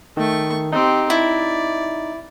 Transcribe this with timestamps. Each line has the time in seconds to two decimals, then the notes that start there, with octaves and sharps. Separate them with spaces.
0.17 D#3 A3 C#6
0.72 C4 D#4 G4
1.10 E4 D5